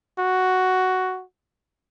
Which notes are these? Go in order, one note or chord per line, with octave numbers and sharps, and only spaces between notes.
F#4